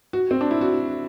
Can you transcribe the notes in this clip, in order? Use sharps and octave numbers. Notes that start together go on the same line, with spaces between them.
F#4
C4
D4
E4
F#4